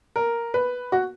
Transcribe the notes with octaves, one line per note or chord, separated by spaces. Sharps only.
A#4
B4
F#4